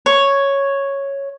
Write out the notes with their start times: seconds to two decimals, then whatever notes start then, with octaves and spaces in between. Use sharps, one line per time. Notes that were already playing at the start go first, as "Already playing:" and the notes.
0.06 C#5